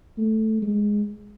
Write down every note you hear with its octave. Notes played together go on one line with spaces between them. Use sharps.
A3
G#3